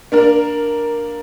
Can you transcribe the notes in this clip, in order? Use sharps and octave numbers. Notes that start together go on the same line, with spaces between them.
A#3 D4 A#4